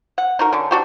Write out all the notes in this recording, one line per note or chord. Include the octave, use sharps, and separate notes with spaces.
F#5
D#4 F#4 A#4
D3 C#4
D4 F#4 G4